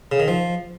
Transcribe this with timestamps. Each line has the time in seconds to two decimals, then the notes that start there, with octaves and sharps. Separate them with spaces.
0.12 C#3
0.20 D#3
0.28 F3